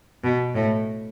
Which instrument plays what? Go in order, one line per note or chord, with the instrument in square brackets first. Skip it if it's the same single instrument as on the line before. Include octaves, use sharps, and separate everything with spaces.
[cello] B2
A2